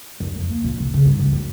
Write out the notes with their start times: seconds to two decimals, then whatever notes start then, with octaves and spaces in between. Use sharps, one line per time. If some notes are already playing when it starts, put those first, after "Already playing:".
0.20 F#2
0.36 F2
0.50 A#3
0.64 A#2
0.80 C3
0.94 C#3
1.05 G2
1.19 C#2
1.33 F#2